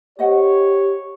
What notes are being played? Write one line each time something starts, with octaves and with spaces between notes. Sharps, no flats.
G4 C5 C#5 D#5 F#5